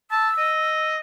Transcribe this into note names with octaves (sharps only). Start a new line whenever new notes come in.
A5 E6
D#5